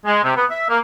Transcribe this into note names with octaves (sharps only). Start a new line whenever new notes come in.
G#3
C3
B3
E5
A#3